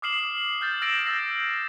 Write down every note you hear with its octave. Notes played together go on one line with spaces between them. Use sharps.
D6 D#6 F6 C7 E7 F#7
F6 G6 A6
E6 A6 A#6 D7 E7 F#7
E6 G6 A#6 C7 F#7